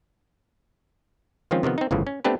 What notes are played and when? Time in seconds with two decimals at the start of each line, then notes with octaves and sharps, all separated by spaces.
1.51 D#3 F3 G#3 C4 C#4 F4
1.63 C3 D#3 F3 B3
1.78 C4 D#4
1.91 G1 A2 C#3 E3 F3
2.07 C#4
2.24 A3 B3 C4 D4 G4 B4